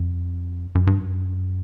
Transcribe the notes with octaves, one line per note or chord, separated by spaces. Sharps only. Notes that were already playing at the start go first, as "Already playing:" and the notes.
Already playing: F2
F#2
G2
F#2